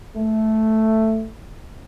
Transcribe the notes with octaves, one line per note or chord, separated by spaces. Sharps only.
A3